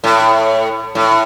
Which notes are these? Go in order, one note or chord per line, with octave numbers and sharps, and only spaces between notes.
A2
A2